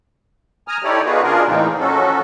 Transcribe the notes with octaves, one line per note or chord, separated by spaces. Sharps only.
G#5 A#5 D#6 F6
D#4 E4 G4 A4 C#5 D5
B3 D#4 F4 F#4 G#4 B4
C#3 D4 F4 G#4 A#4
A2 E3 A#3 C4 D#4
F3 F#3 C#4 F#4 A4